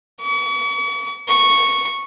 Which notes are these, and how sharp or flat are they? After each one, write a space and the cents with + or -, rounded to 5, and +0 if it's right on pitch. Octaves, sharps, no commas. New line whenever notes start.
C#6 +45
C#6 -5